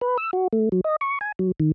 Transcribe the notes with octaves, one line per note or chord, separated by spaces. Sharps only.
B4
E6
F#4
A3
F#3
D#5
C#6
G#5
F#3
D#3